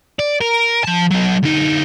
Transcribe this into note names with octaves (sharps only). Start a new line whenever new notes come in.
D5
A#4
F3 A5
F#3 D#4
D2 D#4